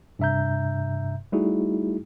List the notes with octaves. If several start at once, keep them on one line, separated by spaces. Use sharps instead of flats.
G2 C3 E5 A#5 G6
G3 A3 D#4 E4 F#4 G#4